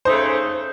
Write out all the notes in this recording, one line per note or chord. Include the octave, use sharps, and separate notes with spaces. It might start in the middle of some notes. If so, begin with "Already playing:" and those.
C#3 A3 D#4 C5